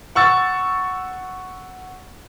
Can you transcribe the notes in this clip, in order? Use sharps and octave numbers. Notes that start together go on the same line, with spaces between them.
F#5 C#6 E6 A6